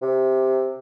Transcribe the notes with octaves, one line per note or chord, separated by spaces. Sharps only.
C3